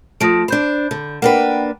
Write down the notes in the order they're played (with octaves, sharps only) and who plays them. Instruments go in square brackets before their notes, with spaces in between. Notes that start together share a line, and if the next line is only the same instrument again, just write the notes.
[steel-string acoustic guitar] F3 A3 [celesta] D#6 A#6 D7
[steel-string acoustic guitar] D4 C5 [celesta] B5 G6
[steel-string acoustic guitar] D3
[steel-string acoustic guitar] A#3 D4 B4 [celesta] F#5 G5